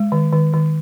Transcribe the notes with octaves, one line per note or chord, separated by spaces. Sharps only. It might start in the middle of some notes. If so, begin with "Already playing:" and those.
Already playing: G#3
D#3
D#3
D#3